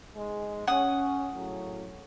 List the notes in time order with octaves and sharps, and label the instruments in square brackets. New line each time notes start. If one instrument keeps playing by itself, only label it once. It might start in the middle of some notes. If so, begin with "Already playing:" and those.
[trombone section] G#2 G#3
[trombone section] C#4 [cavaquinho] F#5 D#6
[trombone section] A2 C#3 F#3